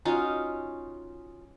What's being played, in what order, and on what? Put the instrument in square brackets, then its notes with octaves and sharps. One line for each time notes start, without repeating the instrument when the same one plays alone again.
[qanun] C#4 D#4 F4 F#4